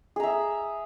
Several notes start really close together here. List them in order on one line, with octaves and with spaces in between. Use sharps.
G#4 A#5 E5